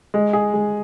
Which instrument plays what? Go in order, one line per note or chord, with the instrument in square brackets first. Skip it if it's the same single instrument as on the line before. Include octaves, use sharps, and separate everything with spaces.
[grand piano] G#3
G#4
G#3